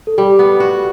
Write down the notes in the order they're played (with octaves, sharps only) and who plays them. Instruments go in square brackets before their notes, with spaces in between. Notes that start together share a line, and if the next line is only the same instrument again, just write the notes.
[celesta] A4
[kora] G3 [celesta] G4
[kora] B3
F#4